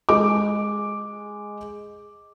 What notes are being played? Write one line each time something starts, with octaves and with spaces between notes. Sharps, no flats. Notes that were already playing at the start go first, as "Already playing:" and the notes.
G#3 D#5 D6